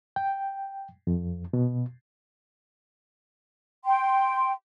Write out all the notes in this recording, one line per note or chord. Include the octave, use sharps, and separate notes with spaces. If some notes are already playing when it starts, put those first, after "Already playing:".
G5
F2
B2
G5 C6